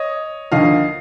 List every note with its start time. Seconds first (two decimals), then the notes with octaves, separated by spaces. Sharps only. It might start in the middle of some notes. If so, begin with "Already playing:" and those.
Already playing: C#5 D#5
0.52 D#2 D3 F3 D#5 F5